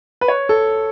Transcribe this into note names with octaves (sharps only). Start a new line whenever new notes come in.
B4
C#5
A4